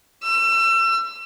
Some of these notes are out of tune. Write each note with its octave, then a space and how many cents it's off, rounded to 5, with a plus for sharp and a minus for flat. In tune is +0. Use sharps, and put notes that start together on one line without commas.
E6 +35